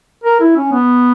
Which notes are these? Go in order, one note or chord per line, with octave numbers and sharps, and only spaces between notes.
A#4
E4
C#4
B3